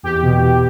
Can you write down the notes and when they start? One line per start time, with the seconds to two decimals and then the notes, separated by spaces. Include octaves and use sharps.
0.03 E2 G4
0.22 B2
0.42 B2